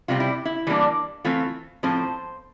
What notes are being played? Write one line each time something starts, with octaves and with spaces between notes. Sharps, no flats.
C3 G3 C4 F4
E4
E4
E3 G3 A#3 D4
E3 A3 C4 F4
A2 F3 C4 C5